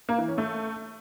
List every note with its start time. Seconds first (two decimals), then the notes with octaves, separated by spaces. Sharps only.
0.09 A#3
0.18 E3
0.28 C#4
0.38 A3